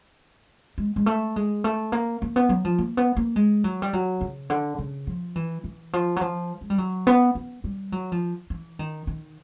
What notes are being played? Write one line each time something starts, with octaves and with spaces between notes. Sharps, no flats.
G#3
G#3
A3
G#3
A3
A#3
A#3
B3
F#3
F3
A#3
B3
A#3
G#3
F#3
G3
F#3
C#3
D3
C#3
F3
E3
E3
F3
F#3
F3
G#3
G3
F#3
B3
B3
G3
F#3
F3
E3
D#3
D#3